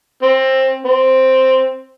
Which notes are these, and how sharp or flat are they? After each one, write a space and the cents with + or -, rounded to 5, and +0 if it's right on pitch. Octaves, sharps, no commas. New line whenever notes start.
C4 +20
C4 +0